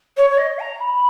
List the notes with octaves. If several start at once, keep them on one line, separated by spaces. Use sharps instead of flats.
C#5
C#5
D#5
A#5
B5